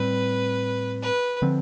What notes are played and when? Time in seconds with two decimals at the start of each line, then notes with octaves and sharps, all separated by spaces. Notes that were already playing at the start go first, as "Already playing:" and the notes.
Already playing: A2 G3 C4 B4
1.02 B4
1.42 D3 F3 C4